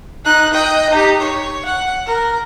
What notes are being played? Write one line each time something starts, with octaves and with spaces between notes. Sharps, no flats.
D#4 F#6
D#5 G5
D#4 G4
C#5
F#5
A#4